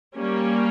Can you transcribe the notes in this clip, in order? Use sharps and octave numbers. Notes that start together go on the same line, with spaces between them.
G3 A#3 C#4